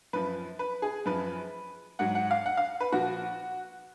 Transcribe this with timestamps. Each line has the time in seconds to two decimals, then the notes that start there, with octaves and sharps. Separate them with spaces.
0.13 F#2 F3 B4
0.59 B4
0.82 G#4
1.06 F#2 F3 B4
1.99 G#2 F#3 F#5
2.15 F#5
2.31 F5
2.46 F#5
2.57 F5
2.80 B4
2.92 A#2 F3 F#4